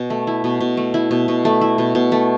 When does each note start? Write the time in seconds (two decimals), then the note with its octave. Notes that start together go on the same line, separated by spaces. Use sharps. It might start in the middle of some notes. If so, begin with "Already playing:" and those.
Already playing: B2
0.10 A3
0.27 E4
0.44 B2
0.61 B2
0.77 A3
0.94 E4
1.11 B2
1.28 B2
1.45 A3
1.61 E4
1.78 B2
1.95 B2
2.12 A3